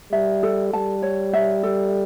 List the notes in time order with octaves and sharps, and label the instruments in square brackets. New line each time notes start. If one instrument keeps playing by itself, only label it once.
[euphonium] G3 [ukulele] E5
[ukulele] A4
[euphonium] G3 [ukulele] A5
[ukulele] C#5
E5
A4